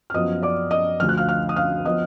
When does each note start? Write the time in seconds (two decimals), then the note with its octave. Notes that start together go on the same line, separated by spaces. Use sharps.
0.10 F6
0.14 F#2 F3 B3 D#5 D#6
0.42 D5 D6
0.71 D#5 D#6
1.00 D2 D3 F3 F6
1.09 F#6
1.18 F5 F6
1.28 F5 F6
1.49 D#6
1.56 F5 F6
1.85 F3 B3 D#5 D#6